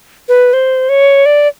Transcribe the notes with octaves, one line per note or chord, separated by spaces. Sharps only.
B4
C5
C#5
D5